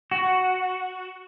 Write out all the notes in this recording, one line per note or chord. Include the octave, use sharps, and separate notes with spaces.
F#4